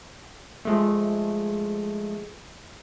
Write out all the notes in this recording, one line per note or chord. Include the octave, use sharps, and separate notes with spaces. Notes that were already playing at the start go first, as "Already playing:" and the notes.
F3 G#3 A3